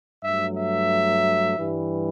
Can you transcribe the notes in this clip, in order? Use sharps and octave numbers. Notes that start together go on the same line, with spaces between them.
G2 F#3 A3 E5
E5
G2 E3 G3